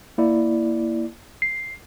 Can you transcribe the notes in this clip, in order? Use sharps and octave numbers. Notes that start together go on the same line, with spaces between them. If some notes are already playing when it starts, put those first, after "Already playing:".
A#3 E4 D5
C7